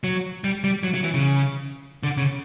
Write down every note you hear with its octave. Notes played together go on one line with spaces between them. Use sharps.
F#3
G3
G3
F#3
F#3
E3
C#3
D3
C#3